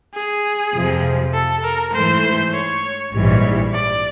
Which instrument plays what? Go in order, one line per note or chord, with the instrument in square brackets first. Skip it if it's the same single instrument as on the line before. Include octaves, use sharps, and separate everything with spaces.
[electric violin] G#4
[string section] F2 C3 F3
[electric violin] A4
A#4
[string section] G#2 E3 A3 [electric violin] C5
[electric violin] C#5
[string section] A#1 G#2 E3 G3 [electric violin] C#5
[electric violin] D5